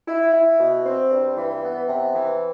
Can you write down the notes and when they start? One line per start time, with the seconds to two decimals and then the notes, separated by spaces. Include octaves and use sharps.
0.08 E4
0.34 E4
0.60 B2
0.85 C4
1.11 G2
1.37 E3
1.64 B3
1.89 C3
2.14 E3